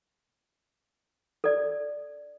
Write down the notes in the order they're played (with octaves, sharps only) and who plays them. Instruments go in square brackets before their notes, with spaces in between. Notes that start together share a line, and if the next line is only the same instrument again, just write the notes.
[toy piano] A4 D5